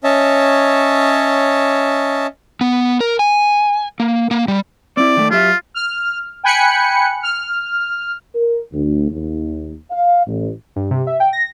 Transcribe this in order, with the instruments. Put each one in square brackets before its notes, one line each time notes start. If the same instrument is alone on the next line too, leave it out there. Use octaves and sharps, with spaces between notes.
[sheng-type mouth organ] C#4 C#5 D#5 E5 A5
[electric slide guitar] B3
A#4
G#5
A#3
A#3
G3
[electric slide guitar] C4 E4 [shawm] D5
[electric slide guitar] D#3 A3
[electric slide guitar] F#3 G4 E5 [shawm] F4
[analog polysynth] F6
G5 G#5 B5 F#6 C#7
F6
[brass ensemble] A#4
D2
D#2
F5
A1
[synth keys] G2
C3
E5
G5
A#6